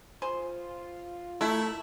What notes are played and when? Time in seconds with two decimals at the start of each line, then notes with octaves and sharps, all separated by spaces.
0.22 F4 G#4 C5
1.41 A3 E4 A#4